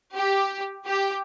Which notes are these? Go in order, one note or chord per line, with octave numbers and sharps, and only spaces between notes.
G4
G4